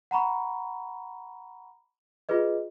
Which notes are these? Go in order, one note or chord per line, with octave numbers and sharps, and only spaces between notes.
F#5 A#5 B5 C#6
F4 F#4 G#4 B4 D#5